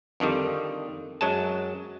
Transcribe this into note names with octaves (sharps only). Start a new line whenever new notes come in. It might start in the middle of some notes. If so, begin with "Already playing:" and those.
F2 D3 D#3 G3
F#2 F#3 G#3 A5